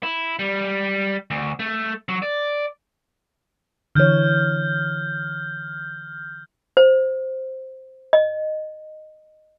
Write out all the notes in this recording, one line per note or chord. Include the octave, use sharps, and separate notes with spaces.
E4
G3
D2
A3
F#3
D5
D3 E3 C#5 F6 G6
C5
D#5